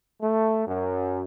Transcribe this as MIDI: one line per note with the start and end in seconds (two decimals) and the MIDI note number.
0.22 0.64 57
0.67 1.24 42